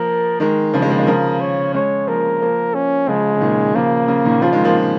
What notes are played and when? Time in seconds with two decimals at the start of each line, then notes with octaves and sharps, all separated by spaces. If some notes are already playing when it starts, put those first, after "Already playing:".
Already playing: F3 A#3 A#4
0.40 D#3 G#3 A#4
0.74 C#3 F3
0.82 D#3 G#3
0.90 F3 A#3
0.99 D#3 G#3
1.07 C#3 F3 A#4
1.40 C#5
1.74 G#3 C#4 C#5
2.07 F3 A#3 A#4
2.42 F3 A#3
2.75 C#4
3.08 C#3 F3 G#3
3.36 C#3
3.41 A#2 D#3
3.75 C#3 F3 A#3
4.08 C#3
4.25 A#2 D#3
4.42 C#3 F3 F4
4.53 D#3 G#3
4.64 F3 A#3